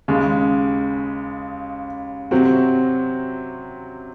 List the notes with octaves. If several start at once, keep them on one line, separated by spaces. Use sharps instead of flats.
D#2 C#3 G#3
C3 F#3 C4 F#4